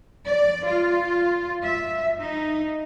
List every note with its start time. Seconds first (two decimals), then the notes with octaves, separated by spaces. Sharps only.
0.25 D5
0.64 F4
1.63 E5
2.19 D#4